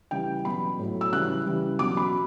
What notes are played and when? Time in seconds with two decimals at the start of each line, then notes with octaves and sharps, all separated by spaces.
0.11 C#3 E3 G3 G5
0.45 B2 F#3 B5
0.79 A2 F#3
1.01 E6
1.13 C#3 E3 G3 F#6
1.47 C#3 E3 G3
1.79 B2 F#3 D6
1.97 B5